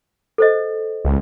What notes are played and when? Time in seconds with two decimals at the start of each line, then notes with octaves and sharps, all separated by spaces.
0.38 A4 C5 D#5
1.05 C#2